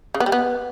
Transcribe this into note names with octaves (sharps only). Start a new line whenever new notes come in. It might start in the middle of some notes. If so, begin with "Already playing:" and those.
C#3
B3
G3
B3